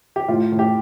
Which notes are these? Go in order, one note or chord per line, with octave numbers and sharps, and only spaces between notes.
G4
A2 F4
A2
G4